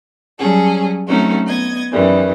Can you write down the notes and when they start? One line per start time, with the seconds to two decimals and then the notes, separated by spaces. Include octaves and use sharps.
0.39 F#3 G3 C#4 G#4 A4
1.08 F#3 A3 C4 C#4 D#4 F#4
1.47 B3 D#5 G#6
1.91 F#2 D#3 E3 G3